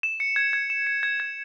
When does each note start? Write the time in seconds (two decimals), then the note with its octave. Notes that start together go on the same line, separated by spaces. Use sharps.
0.03 E7
0.20 C#7
0.36 G#6
0.53 G#6
0.70 E7
0.87 C#7
1.03 G#6
1.20 G#6